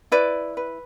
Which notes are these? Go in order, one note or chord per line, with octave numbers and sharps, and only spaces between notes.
E4 B4 D5
B4